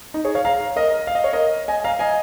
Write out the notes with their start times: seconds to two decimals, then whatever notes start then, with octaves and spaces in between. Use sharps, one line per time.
0.14 D#4
0.25 G#4 C#5
0.35 C#5 F5
0.45 F5 A#5
0.76 A#4 D#5
1.07 F5
1.15 D#5
1.24 C#5
1.33 A#4 D#5
1.68 D#5 G#5
1.84 F5 A#5
1.99 D#5 G#5